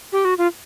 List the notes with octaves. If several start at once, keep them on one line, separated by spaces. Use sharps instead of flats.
G4
F#4
F4